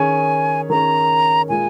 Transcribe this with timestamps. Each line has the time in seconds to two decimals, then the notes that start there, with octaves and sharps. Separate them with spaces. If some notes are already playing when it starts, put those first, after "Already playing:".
Already playing: D#3 C#4 G#4 C#5 G#5
0.70 D#3 C#4 G#4 C#5 A#5
1.49 A#2 G#3 F4 A#4 G#5